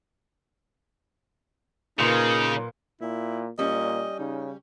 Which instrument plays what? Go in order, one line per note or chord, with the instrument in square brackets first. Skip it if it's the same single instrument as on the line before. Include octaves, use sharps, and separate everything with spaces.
[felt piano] A#2 B4 C6 [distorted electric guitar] C#3 [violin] A#3 [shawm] D#4
[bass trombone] A#2 [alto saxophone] E4
[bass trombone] A#2 [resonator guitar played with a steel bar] G3 C#4 [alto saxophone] D#5
[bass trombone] C#3 [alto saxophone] D#4